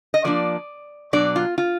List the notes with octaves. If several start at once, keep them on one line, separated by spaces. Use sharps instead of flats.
D#5
F3 A#3 D4 D5
B2 F#3 D4 D5
F4
F4